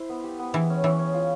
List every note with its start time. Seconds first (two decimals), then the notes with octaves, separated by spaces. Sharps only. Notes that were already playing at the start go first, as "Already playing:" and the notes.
Already playing: E4 C5
0.09 B3
0.24 G4
0.39 B3
0.53 E3 G#3
0.70 C#4
0.84 E3 C#4
0.99 C#4
1.14 F4